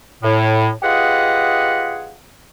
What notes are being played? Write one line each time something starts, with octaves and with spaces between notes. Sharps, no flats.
A2
F4 G4 G#4 B4 D#5 F#5